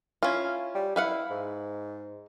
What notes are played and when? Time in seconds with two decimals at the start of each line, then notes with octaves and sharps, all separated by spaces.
0.23 C#4 E4 F4
0.75 G3
0.96 E4 B4 F5 F#5
1.30 G#2